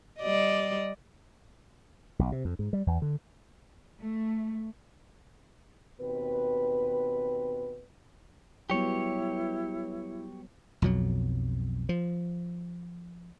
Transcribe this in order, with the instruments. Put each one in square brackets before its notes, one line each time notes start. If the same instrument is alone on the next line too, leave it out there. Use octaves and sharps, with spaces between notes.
[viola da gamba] G3 D5 D#5
[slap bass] B1
C3
F2
G#2
G3
E2
D3
[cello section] A3
[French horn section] D#2 B2 C4 B4
[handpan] F#3 G3 B3 [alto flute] E4 [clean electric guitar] G4 C#5
[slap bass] B1 F2 B2 F#3
F3